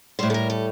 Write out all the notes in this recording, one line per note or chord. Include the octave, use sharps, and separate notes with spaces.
A2 G3 C5
A4
A#4
A4